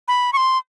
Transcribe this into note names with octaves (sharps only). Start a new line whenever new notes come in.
B5
C#6
C6